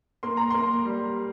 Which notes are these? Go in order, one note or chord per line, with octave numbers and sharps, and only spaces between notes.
A#3 C6
A#5
A#3 C6
G3